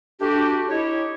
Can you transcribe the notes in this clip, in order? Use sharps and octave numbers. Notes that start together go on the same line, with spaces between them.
A3 D4 F#4 G4
D#4 E4 G4 C#5